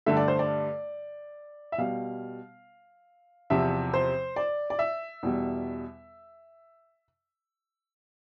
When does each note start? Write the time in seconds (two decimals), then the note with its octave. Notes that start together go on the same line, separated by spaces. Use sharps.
0.06 G2 D3 A3 E5
0.17 D5
0.28 C5
0.39 D5
1.72 E5
1.78 B2 G3 F5
3.50 E2 C3 F3 E5
3.94 C5
4.36 D5
4.70 D5
4.79 E5
5.23 E2 B2 G3